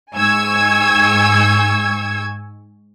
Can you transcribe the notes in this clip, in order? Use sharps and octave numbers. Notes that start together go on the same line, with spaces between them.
G#2 G#5 C#6 E6 G#6